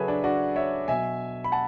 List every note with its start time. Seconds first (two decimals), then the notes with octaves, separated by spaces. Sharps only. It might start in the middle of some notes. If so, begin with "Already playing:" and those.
Already playing: C#3 F#3 G#4 A4 B4 C#5 E5
0.08 D4
0.24 D4 F#4
0.56 C#5 E5
0.88 B2 F#3 E5 G#5
1.44 B5
1.52 F#5 A5